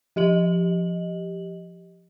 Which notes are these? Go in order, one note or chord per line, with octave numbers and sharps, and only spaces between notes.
F3 G4 D#5 F#7